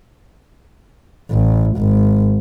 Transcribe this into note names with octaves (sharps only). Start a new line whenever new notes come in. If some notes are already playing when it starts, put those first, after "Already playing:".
A1
G#1